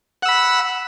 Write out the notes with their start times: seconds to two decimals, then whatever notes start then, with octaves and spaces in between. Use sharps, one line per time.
0.22 F#5
0.25 E6
0.28 B5